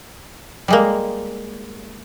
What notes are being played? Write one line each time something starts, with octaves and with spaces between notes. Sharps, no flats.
G3 G#3 A#3